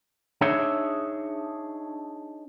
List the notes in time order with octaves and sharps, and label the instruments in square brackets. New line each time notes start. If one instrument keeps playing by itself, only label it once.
[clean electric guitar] D4 D#4 G#4 C#5 E5